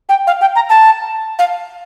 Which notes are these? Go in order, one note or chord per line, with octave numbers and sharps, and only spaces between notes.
G5
F5
G5
A#5
A5
F5